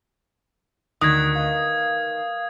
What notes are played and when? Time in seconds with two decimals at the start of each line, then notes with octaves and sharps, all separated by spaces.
1.01 D2 D3 D#3 D#6 F#6 G#6
1.35 A#4 B4 D#5 F5